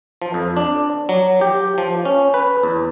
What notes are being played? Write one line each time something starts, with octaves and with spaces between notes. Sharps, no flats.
F3
F2
D4
F#3
G4
F3
C#4
B4
E2